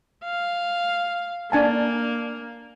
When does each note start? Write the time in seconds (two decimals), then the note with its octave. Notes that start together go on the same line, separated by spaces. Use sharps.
0.24 F5
1.52 A#3 D4 G#5 A5